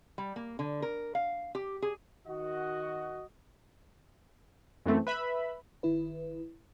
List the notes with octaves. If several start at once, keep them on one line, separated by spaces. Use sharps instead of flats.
G3
A#3
D3
A#4
F5
G4
G#4
D#3 F#4 D#5
F#2 E3 A3 C4
B4 E5 B5
G1 D#3 E4 B4